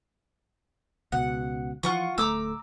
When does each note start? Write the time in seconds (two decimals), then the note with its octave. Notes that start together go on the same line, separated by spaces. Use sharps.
1.12 C#2 B2 F#5
1.83 E3 F3 F4 F#5 C#6
2.18 D1 A3 A#5 D6 E6